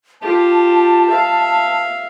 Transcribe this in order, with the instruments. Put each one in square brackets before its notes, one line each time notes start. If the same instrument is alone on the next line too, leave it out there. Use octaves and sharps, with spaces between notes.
[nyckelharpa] F4 G4 [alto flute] A5
[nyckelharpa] E5 F5